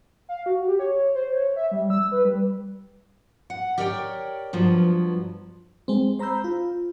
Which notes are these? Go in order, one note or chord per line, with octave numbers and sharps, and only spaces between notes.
F5
F#4
G4
C#5
C5
C#5
E5
G3
E6
B4
G3
F#5
G4 A#4 C#5 D5 E5 G5
G2 F3 F#3 B3
G#3 C4
C5 A#5 B5 E6 G6
F4